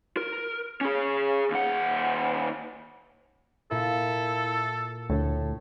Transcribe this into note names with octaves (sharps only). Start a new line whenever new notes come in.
A#4
C#4 G#4
D#2 F#5
A#2 E4 A4
D2 A2